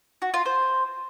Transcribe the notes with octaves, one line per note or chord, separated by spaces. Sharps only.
F#4
F4
C5